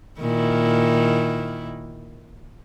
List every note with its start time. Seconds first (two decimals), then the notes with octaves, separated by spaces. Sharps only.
0.21 A#2 D#3 E4